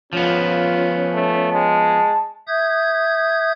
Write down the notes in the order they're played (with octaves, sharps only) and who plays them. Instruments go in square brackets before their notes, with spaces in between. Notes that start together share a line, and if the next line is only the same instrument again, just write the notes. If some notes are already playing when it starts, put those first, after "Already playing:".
[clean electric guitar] F3 B3 [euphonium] C#4 [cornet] F4
[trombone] A3
[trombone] G#3 [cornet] A5
[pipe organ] E5 D#6 G6 G#6